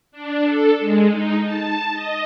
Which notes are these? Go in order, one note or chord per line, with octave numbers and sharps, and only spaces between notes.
D4
A4
G#3
D#4
A5
D#5